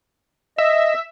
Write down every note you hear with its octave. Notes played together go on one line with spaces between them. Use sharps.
D#5 E5